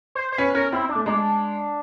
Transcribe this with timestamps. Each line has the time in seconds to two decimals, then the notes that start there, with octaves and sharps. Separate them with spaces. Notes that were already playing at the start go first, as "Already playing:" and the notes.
0.15 C5
0.32 C5
0.38 C#4 B4
0.55 C#4 A#4
0.72 C4 E4
0.89 D4
0.95 A3
1.06 G#3 D4